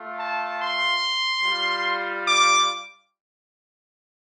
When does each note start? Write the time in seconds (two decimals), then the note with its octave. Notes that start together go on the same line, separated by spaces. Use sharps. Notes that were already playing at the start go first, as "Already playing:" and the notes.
Already playing: A3 F4
0.19 A5
0.60 C6
1.43 G3 F4
2.26 D6